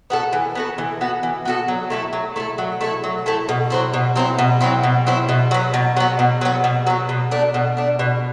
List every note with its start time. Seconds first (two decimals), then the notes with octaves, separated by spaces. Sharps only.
0.10 B3 F#4 A4
0.33 E3
0.55 B3 F#4 A4
0.78 E3
1.01 B3 F#4 A4
1.23 E3
1.45 B3 F#4 A4
1.68 F#3
1.90 A3 E4 A4
2.13 F#3
2.36 A3 E4 A4
2.58 F#3
2.81 A3 E4 A4
3.04 F#3
3.26 A3 E4 A4
3.49 B2
3.70 F#3 C4 E4
3.94 B2
4.16 F#3 C4 E4
4.38 B2
4.61 F#3 C4 E4
4.84 B2
5.06 F#3 C4 E4
5.29 B2
5.51 F#3 B3
5.74 B2
5.96 F#3 B3
6.19 B2
6.41 F#3 B3
6.64 B2
6.87 F#3 B3
7.09 B2
7.31 A3 D4
7.54 B2
7.77 A3 D4
7.99 B2